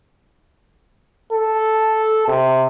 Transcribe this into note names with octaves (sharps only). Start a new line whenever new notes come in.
A4
C3